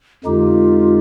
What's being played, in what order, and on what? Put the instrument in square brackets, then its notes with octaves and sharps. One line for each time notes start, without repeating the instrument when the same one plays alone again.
[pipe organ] F2 D3 G#3 D#4 G4 [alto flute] F4